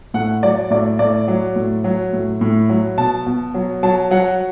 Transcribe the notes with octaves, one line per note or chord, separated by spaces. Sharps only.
A2 F#5
F#3 D5
A2 D5
A2 D5
F#3
A2
F#3
A2
A2
F#3
B2 A5
B2
F#3
F#3 A5
F#3 F#5